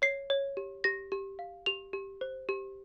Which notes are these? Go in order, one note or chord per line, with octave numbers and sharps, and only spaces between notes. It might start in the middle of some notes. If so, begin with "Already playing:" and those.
C#5 C7
C#5
G4
G4 A#6
G4
F5
G4 F7
G4
C5
G4